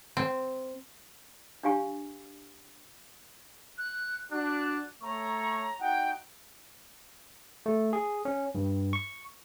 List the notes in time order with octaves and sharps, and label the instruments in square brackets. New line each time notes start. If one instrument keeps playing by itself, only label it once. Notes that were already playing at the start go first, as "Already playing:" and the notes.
[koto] C4
[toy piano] D4 G4 F5 G#5 C#6
[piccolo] F#6
[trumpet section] D4 F#4 [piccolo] F#6
[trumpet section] A3 C#5 C#6 [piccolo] A#5
[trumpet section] D#4 F#4 F#5 [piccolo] G5
[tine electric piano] A3
G#4
C#4
G2
C#6